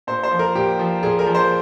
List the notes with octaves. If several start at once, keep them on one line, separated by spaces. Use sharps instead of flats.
A#2 C5
C5
F3
A#4
A#2 G4
F3
A#2 G#4
A#4
F3
C5